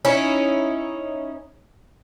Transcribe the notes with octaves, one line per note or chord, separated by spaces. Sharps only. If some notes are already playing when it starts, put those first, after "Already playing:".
C#4 D#4 E4